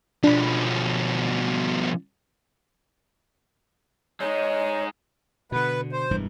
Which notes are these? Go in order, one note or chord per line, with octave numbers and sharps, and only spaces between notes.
B2 F3 D4 B5
G#3 D#4 C#5
B2 D3 B3 B4
C5
E1 G2 E3